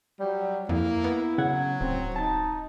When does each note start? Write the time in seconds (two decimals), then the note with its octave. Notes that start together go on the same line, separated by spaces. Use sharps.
0.20 F#3 G3
0.69 F2 A#3 E4
1.04 B3
1.38 C#3 F#3 F#5 G#6
1.81 D1 C4
2.16 D#4 A5 A6